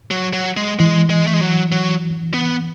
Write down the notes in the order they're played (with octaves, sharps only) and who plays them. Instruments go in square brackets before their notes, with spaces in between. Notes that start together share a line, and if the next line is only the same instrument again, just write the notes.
[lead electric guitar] F#3
F#3
G#3
[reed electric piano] E3 [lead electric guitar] G#3
[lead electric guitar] G#3
A3
G#3
F#3
F#3
B3